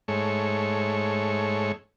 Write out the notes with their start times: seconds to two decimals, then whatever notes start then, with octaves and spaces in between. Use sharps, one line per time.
0.08 G#2 A3 C#5